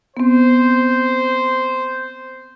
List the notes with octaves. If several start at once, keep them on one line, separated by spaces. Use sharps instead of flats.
B3 C4 C5